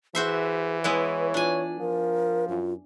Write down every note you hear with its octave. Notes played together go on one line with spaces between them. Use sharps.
E3 F#4 G#4 C5 E5
G#3 B3 E4 B4 C#5
D4 F4 G#5
F3 A#4
F#2 F4